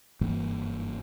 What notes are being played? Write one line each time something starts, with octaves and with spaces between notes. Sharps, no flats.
F#1 G2 E3 A#3